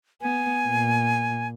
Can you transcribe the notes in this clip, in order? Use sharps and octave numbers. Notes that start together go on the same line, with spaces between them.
B3 G#5
A#2